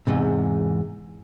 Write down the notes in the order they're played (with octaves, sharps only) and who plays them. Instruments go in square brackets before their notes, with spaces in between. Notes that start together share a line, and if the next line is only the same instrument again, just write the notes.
[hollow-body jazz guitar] E2 G#2 C3